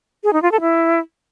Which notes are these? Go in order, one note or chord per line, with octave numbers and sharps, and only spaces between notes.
G#4
D#4
F4
A4
E4